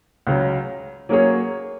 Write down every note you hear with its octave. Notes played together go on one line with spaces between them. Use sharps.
C#2 C#3 F#3
F#3 A#3 C#4 G#4 C#5